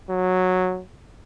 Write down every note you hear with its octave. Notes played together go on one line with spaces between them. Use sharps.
F#3